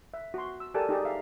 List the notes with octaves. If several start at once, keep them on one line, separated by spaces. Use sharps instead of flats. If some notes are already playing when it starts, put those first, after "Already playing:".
E5
F#4 C6
E6
G4 A4 A#4 D5 G#5 A5
D#4 G4 G#4 D5
E5 F5